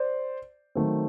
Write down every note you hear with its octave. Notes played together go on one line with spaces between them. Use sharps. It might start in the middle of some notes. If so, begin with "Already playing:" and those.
Already playing: C5 D5
D#3 F#3 A3 C4